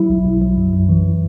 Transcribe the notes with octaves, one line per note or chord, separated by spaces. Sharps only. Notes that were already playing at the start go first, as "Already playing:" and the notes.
Already playing: F#3 E4
B1
B1
F#3
F#2
F#2
E3